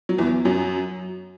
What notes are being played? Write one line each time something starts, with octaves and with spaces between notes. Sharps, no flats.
F#3
E2 E3
F#2 F#3